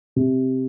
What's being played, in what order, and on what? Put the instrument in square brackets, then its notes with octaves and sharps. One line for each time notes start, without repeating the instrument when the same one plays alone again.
[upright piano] C3